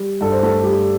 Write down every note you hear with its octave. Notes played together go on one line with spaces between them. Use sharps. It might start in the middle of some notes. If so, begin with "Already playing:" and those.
Already playing: G3
G2 A4
C5
A3 A4
G3 G4